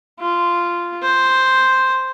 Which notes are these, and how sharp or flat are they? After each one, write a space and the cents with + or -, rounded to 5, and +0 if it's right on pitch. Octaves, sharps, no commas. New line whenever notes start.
F4 -10
C5 +0